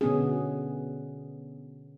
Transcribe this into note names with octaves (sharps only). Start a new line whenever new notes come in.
B2 D3 B3 C#4 G#4